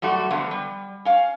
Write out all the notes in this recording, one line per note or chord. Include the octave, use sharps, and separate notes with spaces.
F#2 G3 A3 F#4
D3 F3 A3 B3
G3
C#4 F5